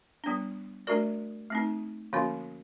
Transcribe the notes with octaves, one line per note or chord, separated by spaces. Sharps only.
G3 B3 D4
A3 D4 F#4 A#4 D5
A3 C4 D#4
D3 F3 A#3 C#4 F#4